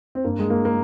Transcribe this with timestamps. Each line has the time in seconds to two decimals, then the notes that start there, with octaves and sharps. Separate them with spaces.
0.15 C4
0.24 G2 A#3
0.39 G#3
0.50 A#3
0.65 A#3